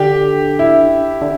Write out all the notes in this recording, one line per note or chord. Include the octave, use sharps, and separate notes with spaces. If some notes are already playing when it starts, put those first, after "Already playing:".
Already playing: D3 G4
E4
D3